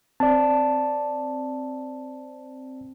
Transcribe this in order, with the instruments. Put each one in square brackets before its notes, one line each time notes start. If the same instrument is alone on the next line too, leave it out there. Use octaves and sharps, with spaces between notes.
[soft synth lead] C4 [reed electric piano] D5 A5